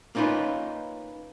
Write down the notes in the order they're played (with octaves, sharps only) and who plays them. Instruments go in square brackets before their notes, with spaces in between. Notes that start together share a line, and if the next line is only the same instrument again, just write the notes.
[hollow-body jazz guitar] A#3 C#4 D#4 F4 B4